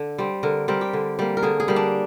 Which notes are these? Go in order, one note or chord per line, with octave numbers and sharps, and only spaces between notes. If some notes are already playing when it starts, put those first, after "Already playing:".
Already playing: D3
G3 C4
D3 A#4
G3 C4 A#4
G4
D3
G3 A#3
A#4
D3 G#4
G#4
G3 A#3
D4